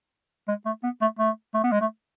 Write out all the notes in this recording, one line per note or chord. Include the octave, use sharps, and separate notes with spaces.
G#3
A3
B3
A3
A3
A3
B3
G#3
A3